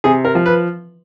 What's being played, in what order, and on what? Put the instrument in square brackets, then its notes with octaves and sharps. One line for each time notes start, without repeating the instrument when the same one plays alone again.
[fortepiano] C3 G#4
A#4
F3
B4